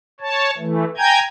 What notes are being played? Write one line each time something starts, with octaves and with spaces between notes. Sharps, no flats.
C#5 A5
E3 A3
G5 G#5 A#5 G6 G#6